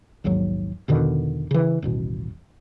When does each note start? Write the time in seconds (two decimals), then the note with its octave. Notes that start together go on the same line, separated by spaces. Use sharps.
0.24 A#1 D#2 G#2 F#3
0.88 E2 B2 D3 D#3
1.51 C#3 E3
1.82 D#1 A1 B2